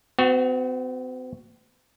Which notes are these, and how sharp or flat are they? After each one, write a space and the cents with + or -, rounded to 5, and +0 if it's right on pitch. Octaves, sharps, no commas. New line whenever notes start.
C4 -45 F#4 +0